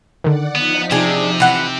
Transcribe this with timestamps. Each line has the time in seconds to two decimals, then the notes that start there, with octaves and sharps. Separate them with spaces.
0.24 D3 D#3 D5 F#5
0.56 F3 B3 D#4
0.91 C3 D4 G#4
1.40 E3 F#5